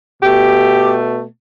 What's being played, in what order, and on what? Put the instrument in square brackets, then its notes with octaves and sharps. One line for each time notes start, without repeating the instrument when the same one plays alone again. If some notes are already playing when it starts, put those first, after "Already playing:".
[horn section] B2 A3 G4